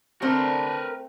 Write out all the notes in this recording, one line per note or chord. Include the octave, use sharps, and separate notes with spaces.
D3 A3 C4 D4 A#4 B4